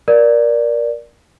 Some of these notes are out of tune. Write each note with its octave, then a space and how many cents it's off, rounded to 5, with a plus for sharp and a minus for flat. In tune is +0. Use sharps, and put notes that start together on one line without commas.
A#4 +20 D5 +0